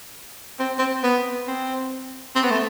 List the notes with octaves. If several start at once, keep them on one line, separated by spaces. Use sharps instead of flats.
C4
C4
B3
C4
C4
B3
A3